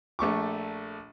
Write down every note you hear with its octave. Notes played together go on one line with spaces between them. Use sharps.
A#1 A3 C#6 D6